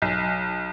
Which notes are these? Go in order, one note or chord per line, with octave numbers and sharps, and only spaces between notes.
B1